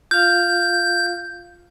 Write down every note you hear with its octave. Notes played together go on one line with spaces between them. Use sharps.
F4 F5 G6